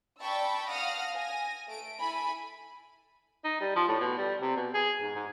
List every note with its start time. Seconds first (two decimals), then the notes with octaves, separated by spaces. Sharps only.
0.20 D5 G5 A5 B5 C#6 E6
0.70 F5 F#5 D#6 F6 A#6
1.14 G#5 A#6
1.68 A3 D7
1.98 E4 A4 G#5 B5
3.44 D#4
3.61 G3
3.76 F3
3.88 A2
4.00 B2
4.18 G3
4.41 C3
4.56 B2
4.74 G#4
5.01 G#2
5.15 G#2